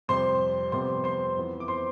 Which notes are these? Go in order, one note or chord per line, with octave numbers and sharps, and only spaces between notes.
F2 C3 G3 C5 C6
F2 C3 G3 B3 C5 C6
C5 C6
F2 E3 B3
D6
C5 C6